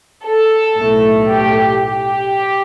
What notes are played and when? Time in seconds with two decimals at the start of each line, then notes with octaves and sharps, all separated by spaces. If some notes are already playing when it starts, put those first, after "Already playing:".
0.27 A4
0.77 B1 A2 A3
1.29 G4
1.81 G4